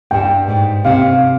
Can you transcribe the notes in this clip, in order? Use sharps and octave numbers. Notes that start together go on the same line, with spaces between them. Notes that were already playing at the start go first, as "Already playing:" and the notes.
G2 G5
G#2
C3 F5